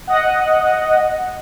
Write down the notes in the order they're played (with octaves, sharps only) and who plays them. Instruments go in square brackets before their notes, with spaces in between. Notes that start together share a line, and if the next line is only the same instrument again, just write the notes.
[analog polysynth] D#5 F#5